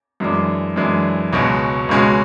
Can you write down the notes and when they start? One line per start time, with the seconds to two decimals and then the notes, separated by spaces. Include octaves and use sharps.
0.20 F#2 E3 G#3 D4
0.76 F#2 E3 G#3 D4
1.33 C#2 B2 G#3 C#4 F#4
1.89 C#2 B2 G#3 C#4 F#4